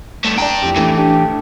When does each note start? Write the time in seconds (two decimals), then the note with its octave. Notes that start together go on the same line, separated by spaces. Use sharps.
0.24 G2 A3
0.38 D4 D5 G5 A5 A#5
0.62 F2 E3 G4
0.76 A1 E3 A3 D4
0.98 D4 G4